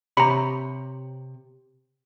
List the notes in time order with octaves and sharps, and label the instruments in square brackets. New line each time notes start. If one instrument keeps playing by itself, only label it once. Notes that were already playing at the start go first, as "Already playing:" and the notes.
[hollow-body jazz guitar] C3 G4 C#5 [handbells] A#5 B5